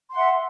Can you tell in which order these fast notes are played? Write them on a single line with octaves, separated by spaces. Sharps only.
C6 F#5 E5